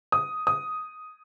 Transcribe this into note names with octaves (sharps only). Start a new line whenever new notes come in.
D#6
D#6